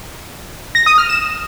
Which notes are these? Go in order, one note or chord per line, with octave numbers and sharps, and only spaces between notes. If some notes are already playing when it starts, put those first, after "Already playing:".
A#6
D#6
F6
E7